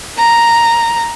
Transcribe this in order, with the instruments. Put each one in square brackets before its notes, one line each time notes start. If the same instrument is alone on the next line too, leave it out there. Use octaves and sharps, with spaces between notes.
[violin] A#5